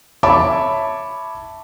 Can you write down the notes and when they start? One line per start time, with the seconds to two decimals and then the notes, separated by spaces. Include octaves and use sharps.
0.23 C#5 E5 A5 B5 D6